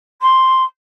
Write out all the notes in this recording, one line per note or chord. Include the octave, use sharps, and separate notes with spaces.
C6